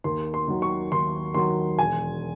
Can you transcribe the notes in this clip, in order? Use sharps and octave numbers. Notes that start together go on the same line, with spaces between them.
D#2 C6
C6
D#3 F#3
C#6
D#2 C6
D#3 F#3 C6
E1 G#5